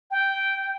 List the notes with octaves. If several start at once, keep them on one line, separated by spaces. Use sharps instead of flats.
G5